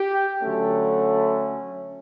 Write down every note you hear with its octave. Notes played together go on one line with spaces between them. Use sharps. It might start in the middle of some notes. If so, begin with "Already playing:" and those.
Already playing: G4
D3 F#3 A3 C#4